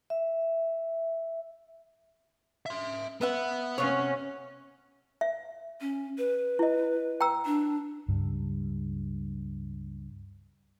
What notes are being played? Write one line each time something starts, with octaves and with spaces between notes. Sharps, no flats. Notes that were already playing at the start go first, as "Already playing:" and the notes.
E5
E5 C6
B3 B4 E5 F#5
C3 C#4 C#5 F5 F#5
E5
C#4
B4
E4 D#5
G5 A#5 E6
D4
C#2 G2 G3